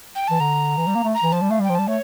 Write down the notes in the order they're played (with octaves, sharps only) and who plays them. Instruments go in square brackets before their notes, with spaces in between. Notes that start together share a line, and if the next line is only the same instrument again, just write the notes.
[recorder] G5
[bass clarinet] E3 [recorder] A5
[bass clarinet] D3 [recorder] A#5
[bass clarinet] E3
G3
A#3
A3
[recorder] A#5
[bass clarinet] E3
[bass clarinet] F3 [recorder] A5
[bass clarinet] G3
[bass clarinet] A3 [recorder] F5
[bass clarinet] G3 [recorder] G5
[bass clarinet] F3
[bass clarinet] G3 [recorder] A5
[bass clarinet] A3 [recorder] C#5